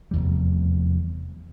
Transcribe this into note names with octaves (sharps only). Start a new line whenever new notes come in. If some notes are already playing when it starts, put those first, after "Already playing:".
F1 E2 G3